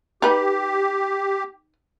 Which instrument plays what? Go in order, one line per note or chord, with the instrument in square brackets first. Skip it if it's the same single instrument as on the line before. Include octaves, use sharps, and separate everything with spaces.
[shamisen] D#4 B4 [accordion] G4